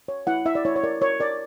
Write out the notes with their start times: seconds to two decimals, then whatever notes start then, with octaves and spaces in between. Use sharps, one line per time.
0.08 C#5
0.27 E4 F#5
0.45 E4 E5
0.55 D5
0.65 E4 C#5
0.76 C#5
0.84 A#4 D5
1.01 A#4 C#5
1.20 A#4 D5